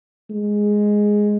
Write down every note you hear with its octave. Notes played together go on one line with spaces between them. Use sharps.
G#3